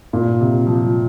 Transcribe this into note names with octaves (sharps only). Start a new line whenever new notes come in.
A#2
C3
F3
F3